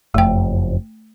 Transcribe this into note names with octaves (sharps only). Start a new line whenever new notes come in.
F#1 F2 A3 G5